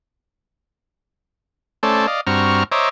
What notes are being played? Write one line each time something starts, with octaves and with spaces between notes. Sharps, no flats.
A3 C#4 A4 C5 D5
D5 D#5 F5
G2 C4 F#4 A#5 C#6 F6
C5 C#5 D#5 E5 A#5 D6